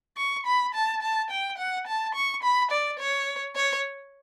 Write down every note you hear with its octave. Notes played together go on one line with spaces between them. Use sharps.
C#6
B5
A5
A5
G5
F#5
A5
C#6
B5
D5
C#5
C#5